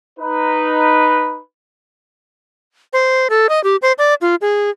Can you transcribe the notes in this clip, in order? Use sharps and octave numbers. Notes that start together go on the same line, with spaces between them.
D#4 B4
C5
A4
D#5
G4
C5
D5
F4
G#4